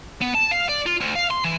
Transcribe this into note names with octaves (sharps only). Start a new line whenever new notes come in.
B3
A5
F5
D5
F4
D2
F5
C6
E3